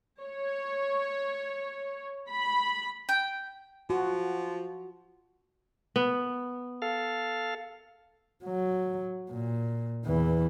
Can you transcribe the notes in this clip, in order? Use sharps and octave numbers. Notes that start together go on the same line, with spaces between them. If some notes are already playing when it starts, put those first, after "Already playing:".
C#5
B5
G5
F3 F#4
B3
A4 F5
F#3
A#2
E2 E3